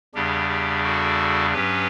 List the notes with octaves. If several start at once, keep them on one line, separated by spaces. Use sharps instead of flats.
E2 C#3 G3 D4 G4
G4
F#4 A4
G2 F#3 C#4 G4 B4